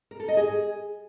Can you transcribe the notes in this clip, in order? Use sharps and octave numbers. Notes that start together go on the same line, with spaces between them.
A#4
A4
D#5
G#4